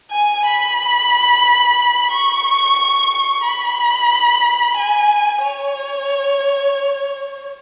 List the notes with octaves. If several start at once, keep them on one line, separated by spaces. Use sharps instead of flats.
G#5
B5
C#6
B5
G#5
C#5